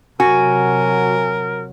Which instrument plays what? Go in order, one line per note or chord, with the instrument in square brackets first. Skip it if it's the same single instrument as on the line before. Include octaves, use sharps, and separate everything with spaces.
[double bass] C3 F#3 [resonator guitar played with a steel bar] F#4 [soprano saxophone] A#4 [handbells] G#5